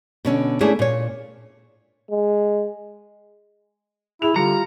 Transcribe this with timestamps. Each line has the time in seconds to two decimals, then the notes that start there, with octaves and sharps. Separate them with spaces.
0.25 B2 D3 C#4
0.61 A3 A#3 C#4 D4 E4 G#4
0.79 A#2 C#5
2.11 G#3
4.22 E4 G#4 F7
4.36 D3 G3 F4 A#5 C#7